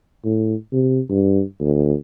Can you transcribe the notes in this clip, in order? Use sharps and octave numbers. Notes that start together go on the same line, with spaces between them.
A2
C3
G2
D2